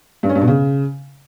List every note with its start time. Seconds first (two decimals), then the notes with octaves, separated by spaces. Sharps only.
0.23 G2
0.29 C#4
0.35 G2
0.42 B2
0.48 C#3